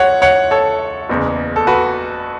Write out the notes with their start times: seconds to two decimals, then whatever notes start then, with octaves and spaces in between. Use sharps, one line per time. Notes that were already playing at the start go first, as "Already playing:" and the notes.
Already playing: C#2 C#5 F#5
0.22 C#5 F#5
0.51 A4 C#5
1.10 F#1 E2 C#3
1.56 A4
1.67 F#4 B4